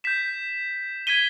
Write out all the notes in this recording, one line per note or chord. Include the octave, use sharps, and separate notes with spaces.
G6 B6 E7
G#6 B6 D#7 G7